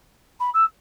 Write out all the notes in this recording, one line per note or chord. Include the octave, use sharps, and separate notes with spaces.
B5
E6